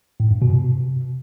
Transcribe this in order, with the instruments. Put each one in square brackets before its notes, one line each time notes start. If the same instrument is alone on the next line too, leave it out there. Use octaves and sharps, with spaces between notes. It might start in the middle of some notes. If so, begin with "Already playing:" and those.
[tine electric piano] A2
G2
B2
C3